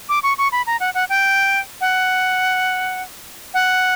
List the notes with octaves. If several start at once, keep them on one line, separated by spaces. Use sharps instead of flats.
D6
C#6
C#6
B5
A#5
F#5
F#5
G5
F#5
F#5